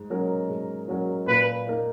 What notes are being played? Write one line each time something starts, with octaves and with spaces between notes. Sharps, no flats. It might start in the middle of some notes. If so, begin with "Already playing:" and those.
Already playing: G#2
F#3 C#4 F#4 A#4
G#2
F#3 C#4 F#4 A#4
A#2 B4
A#3 D#4 A#4